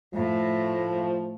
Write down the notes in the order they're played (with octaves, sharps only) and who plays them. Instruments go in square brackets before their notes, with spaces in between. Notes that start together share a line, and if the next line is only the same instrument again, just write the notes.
[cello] A2 A3 [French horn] F3